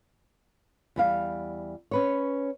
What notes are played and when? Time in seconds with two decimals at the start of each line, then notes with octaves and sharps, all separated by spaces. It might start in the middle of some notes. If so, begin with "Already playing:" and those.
0.96 E2 G3 F5
1.91 C#4 B4 C#5